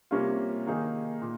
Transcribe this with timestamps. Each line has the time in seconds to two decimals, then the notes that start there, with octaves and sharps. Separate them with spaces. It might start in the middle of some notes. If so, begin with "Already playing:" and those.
0.11 C3 G3 A#3 C#4 F4
0.66 D#3 A#3 D#4 G#4
1.22 A#2